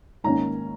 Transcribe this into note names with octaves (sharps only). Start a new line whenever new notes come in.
G#2 D#3 A#3 C#4 A#5